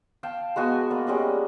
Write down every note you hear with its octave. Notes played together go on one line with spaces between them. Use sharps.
F5 G5 A5
G#3 B3 F#4 G#5
A#3 D5
G3 G#3 C#4 D#5